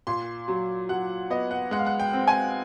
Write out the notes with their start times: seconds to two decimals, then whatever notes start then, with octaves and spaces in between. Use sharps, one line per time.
0.07 A#2 C6
0.48 F#3
0.89 F#3 F#5
1.30 B3 D#5
1.51 F#5
1.71 G#3 F#5
1.79 F5
1.86 F#5
2.00 G5
2.13 C4
2.28 G#5